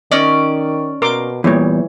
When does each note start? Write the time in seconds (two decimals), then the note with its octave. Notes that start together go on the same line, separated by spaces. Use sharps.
0.12 D#3 C#4 D5 D#5
1.02 B2 A#4 C6 D6
1.44 E2 A#2 E3 G3 E4 C#5